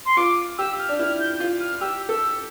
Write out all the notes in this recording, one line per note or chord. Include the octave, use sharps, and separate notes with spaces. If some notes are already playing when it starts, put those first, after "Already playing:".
C6
F4 D6
G4 E6
F6
D4
E4 F6
G6
F4
F6
G4 E6
A4 E6